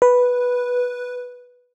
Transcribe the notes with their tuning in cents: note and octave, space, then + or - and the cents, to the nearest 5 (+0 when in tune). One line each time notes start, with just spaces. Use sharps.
B4 -5